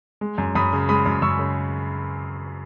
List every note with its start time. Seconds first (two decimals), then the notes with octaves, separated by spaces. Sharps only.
0.21 G#3
0.38 F#2
0.55 F#2 B5 D#6
0.73 C#3
0.89 G#3 B5 D#6
1.06 F#2
1.22 F#2 C#6 E6
1.39 C#3